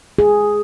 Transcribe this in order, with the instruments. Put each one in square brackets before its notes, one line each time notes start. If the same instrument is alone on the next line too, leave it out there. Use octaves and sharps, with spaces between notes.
[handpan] G#4